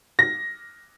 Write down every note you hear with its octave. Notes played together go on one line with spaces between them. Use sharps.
A#6